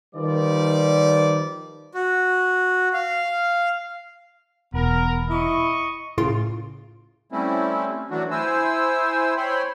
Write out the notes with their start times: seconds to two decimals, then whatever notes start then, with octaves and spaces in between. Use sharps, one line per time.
0.15 D#3 F3 G3 A#4 B4 D5
1.94 F#4
2.93 F5
4.74 E1 B3 A#4
5.30 E4 D#5 C#6
6.18 A2 C#3 F4 C6 D7
7.32 G3 A3 C4 C#4 E4
8.11 E3 F#3 A3 D4 F#4
8.31 E4 C5 G#5 E6
9.37 C5 C#5 G5 B5 C6